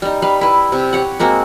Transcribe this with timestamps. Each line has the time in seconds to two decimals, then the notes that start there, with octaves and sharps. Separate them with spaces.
0.02 G3 D#4
0.22 G3 B4 F5
0.41 E4 B4
0.72 C3
0.93 G4 C#5 F#5
1.19 G#3 A#3 C4 F#4